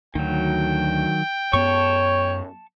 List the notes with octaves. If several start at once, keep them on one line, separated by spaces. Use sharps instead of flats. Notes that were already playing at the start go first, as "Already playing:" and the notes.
D2 D#3 F#3 G5
F#2 B3 C#5 A5 C#6